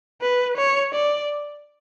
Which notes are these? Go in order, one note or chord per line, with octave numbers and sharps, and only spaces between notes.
B4
C#5
D5